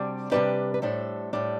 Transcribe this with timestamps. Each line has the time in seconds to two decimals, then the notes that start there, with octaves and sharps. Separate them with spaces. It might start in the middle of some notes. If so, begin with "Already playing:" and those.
Already playing: C3 G3 D4 F#4
0.31 C3 G3 D4 G4 B4
0.74 B4
0.82 A2 G3 D4 A4 C5
1.33 A2 G3 D4